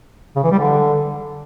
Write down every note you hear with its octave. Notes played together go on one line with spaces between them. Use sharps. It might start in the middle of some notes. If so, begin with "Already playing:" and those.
C#3
E3
G3
D3